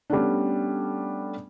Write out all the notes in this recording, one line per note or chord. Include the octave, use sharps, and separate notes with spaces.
G3 A3 B3 C#4 D4